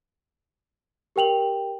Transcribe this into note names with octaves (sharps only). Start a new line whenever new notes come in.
G4 A#4 G5 F7 F#7